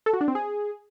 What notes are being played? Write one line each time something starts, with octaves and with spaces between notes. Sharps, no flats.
A4
F#4
D4
C4
G#4